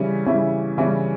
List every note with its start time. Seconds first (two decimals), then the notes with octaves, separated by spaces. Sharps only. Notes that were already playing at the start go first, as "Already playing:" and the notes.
Already playing: C#3 E3 G3 C#4 E4
0.26 C#3 E3 G3 C#4 E4
0.77 C#3 E3 G3 C#4 E4